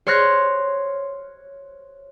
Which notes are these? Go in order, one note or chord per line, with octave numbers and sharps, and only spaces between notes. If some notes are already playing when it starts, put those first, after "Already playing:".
C5 C#5 C6 F6 F#6 A#6